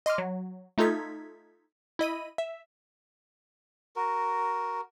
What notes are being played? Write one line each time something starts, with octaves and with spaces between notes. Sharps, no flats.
D#5 C6 D6 F6
F#3
A3 D#4 F4 A4 G#6 B6
E4 D#5 B5 D#7
E5
F#4 A#4